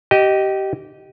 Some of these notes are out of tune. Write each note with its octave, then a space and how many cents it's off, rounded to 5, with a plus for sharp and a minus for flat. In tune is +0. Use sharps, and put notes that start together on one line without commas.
G4 -20 D#5 +0